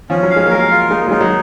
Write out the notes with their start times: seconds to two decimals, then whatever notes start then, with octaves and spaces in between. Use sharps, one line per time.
0.10 F3 C#4
0.23 F#3
0.30 F5
0.36 G#3
0.45 A#3
0.50 G#3 A#4
0.71 F4
0.90 G#3 D#4
1.01 A#3
1.07 F#3
1.11 G#3 D#4
1.21 F#3